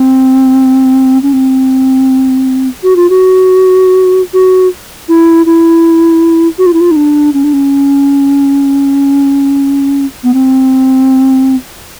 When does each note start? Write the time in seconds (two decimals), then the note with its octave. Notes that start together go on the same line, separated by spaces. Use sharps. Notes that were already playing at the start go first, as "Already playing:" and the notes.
Already playing: C4
1.23 C#4
1.33 C4
2.83 F#4
2.96 F4
3.10 F#4
4.34 F#4
5.09 E4
5.46 E4
6.58 F#4
6.66 F4
6.73 E4
6.81 F4
6.91 D#4
6.96 D4
7.34 C#4
7.44 D4
7.53 C#4
10.24 B3
10.34 C4